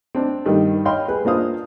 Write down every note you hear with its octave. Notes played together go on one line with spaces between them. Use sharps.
C4 D4
G2 D#3
C#5 D#5 F5 G5 B5 C6
G#4 B4
A#2 A#3 D4 C5 F5 D#6